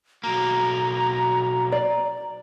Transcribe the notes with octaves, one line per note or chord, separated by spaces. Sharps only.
B1 A#3 F#4 A#5
D5 A#5